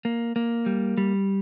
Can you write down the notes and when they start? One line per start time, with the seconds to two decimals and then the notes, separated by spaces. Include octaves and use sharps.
0.05 A#3
0.36 A#3
0.66 G3
0.98 G3